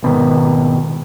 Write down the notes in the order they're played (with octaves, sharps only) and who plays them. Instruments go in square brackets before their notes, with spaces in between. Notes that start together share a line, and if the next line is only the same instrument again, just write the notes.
[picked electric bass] G#1 B2 D#3